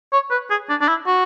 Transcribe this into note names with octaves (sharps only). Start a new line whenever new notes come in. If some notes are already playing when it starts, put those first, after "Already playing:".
C#5
B4
G#4
D4
D4
E4
F#4